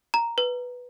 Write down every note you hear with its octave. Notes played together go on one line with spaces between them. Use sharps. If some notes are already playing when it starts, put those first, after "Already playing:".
A#5
B4